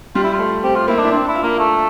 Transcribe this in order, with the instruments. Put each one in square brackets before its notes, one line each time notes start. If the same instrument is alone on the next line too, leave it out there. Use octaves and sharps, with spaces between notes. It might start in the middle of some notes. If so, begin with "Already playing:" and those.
[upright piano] G3 [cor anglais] F4
[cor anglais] E4
F4
[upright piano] A3
[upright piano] C4 [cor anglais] G4
[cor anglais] F4
[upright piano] A#3 [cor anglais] E4
[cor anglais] D4
[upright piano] E4
[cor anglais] C4 [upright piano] D4
[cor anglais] E4
[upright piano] F4
[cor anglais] A#3
A3